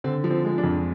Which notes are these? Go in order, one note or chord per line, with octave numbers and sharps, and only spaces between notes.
D3 C4
F3
C4
G#3
D4
F2